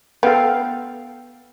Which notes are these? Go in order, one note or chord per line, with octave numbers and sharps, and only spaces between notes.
B3 A4 F5 G5